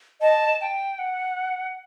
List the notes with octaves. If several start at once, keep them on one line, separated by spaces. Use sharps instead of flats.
D#5 A5
G5
F#5